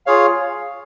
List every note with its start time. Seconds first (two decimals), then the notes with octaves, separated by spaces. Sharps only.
0.06 F4 G#4 C#5 F5